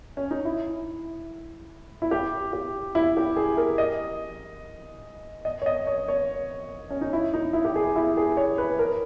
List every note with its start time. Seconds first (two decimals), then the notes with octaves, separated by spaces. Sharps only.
0.17 C#4
0.31 D#4
0.45 E4
2.02 E4
2.11 G4
2.53 G4
2.95 E4
3.17 G4
3.37 G#4
3.57 A#4
3.78 D#5
5.45 D#5
5.62 C#5
5.66 D#5
5.87 C#5
6.08 C#5
6.90 C#4
7.01 D#4
7.13 E4
7.34 D#4
7.53 E4
7.65 G4
7.76 G#4
7.96 E4
8.17 G#4
8.37 C#5
8.58 B4
8.79 A#4